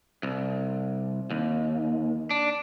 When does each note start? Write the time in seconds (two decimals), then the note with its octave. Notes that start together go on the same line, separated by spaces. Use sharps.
0.23 C2
1.31 D#2
2.31 D4